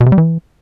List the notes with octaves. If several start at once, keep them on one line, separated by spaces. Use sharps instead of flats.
B2
C3
G3
E3